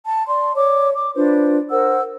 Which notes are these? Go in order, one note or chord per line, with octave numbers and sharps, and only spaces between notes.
A5
D5 C6
C#5 D5 D6
D6
D4 F4 B4 C5
A#4 C5 F#5 E6